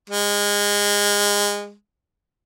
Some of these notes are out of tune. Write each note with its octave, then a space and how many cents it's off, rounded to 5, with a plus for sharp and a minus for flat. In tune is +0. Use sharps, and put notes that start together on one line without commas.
G#3 -25